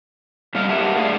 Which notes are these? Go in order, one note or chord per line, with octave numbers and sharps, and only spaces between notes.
B2 D3 G3 A3 F5
G2 A#3 G4 E5 F#5 A5
G2 A3 G#4 D5 F5